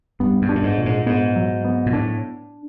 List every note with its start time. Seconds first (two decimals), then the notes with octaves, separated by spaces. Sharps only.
0.20 G2 B3
0.42 G2
0.49 D4
0.55 A2
0.63 G#2
0.78 A#2
0.86 G#2
1.06 G#2 B3
1.36 F#3
1.65 B3
1.86 A#2
1.93 A2 D4